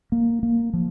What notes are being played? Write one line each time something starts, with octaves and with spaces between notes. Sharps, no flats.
A#3
A#3
F3